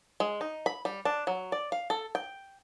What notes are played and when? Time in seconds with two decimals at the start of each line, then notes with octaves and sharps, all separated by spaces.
0.20 G#3
0.41 D#4
0.66 B5
0.85 G3
1.05 D4
1.27 F#3
1.52 D5
1.72 F5
1.90 A4
2.15 G5